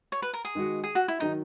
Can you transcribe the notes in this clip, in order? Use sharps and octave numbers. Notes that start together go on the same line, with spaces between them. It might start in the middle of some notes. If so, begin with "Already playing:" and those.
C#5
B4
A#4
G#4
D#3 G#3 D#4 F#4
G#4
F#4
E4
D#3 F#3 D#4